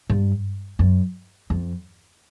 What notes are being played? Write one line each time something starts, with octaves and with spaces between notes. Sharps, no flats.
G2
F#2
F2